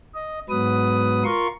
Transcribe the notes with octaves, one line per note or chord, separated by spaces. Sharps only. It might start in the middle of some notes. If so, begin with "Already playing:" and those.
D#5
G#2 F#3 B3 B4 D#6
F4 A#4 C6 C#6